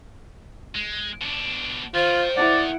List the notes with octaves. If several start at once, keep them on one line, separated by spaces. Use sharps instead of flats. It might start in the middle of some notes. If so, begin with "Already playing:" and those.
G#3
B2 D4
D#3 F4 C5
E4 D5 F#5